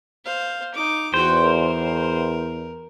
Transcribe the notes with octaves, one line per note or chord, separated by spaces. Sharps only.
C5 F5
D#4 D6
E2 F#4 C5 G5
A#4